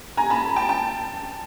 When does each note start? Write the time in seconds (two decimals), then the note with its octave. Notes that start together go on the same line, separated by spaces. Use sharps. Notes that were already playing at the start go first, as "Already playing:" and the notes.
0.17 G#5 A#5
0.30 A5 B5
0.56 G5 A5
0.69 G5 A5